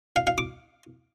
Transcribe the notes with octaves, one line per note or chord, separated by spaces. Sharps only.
F5
F5
D6